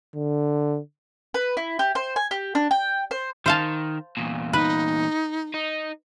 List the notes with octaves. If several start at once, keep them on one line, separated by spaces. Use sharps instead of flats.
D3
B4
E4
G4
C5
G#5
G4
D4
G5
C5
D#3 C5 F5 A5
E2 A#2
D#4 B4
D#4